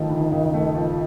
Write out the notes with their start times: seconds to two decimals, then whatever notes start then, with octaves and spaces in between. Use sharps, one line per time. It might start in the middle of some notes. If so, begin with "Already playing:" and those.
Already playing: D#3 F3 A3
0.10 D2
0.31 C#3
0.54 A3
0.75 F3